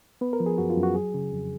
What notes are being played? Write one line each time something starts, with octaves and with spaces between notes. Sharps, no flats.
B3 B4
A#4
F3
G#4
F#2 F#4
F4
F#2
F#4
F#3 G#4
C#3
F2